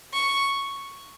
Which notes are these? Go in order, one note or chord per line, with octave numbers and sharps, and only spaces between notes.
C#6